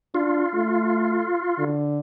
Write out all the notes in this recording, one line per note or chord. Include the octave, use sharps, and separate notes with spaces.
D4 F4
A3
D3